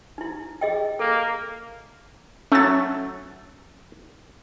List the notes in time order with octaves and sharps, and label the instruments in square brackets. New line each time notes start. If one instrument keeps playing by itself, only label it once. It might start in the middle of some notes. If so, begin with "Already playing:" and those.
[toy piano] D#4 E4
G#4 D#5 G5
[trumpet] A#3 [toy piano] A4
[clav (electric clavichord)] F#3 A3 [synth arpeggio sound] C#4 A6